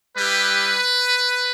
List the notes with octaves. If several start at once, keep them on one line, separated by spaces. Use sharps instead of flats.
G3 E4 G4 B4